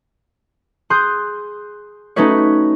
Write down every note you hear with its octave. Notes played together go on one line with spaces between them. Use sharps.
G#4 C6 D#6 F#6 G6
A3 C#4 D#4 F#4 B4 C#5